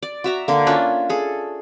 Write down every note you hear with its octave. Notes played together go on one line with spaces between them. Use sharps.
D5
F#4 E5 A#5
D3 A#3
C#4 D4 F4 E5
G#4 A4